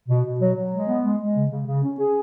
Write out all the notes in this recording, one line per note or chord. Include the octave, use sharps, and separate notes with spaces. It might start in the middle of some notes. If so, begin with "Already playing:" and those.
B2
B2
F#3
F#3
G#3
B3
G#3
G#3
C#3
C#3
C#3
C#4
G#4